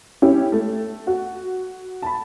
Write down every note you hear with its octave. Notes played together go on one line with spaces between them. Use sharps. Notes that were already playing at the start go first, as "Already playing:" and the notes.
C#4 E4 G4
A3
F#4
A5 B5